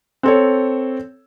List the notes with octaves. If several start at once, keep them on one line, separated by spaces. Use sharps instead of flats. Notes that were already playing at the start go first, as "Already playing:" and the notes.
C4 A4 C#5